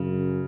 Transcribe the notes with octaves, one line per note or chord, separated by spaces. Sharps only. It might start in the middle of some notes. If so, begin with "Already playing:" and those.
Already playing: F#2 C#3